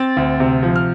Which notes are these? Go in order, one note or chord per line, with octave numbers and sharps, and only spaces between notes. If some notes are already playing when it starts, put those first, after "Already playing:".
Already playing: C4 A6
D2
C3
F3
F6